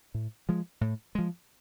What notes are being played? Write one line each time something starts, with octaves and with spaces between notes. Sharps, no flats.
A2
F3 G#3
A2
F3 G#3